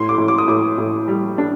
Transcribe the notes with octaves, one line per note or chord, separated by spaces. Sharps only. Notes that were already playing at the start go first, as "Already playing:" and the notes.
Already playing: A2 C6
D6
A2
D6
D#6
A2 D6
A2
G3
D4